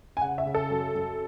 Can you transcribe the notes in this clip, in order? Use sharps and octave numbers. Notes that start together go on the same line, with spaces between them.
G#5
C#3 F#5
E5
C#3
A4
F#2
F#2